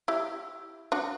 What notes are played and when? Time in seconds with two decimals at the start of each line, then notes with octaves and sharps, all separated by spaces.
0.08 E4 G4
0.92 D4 F#4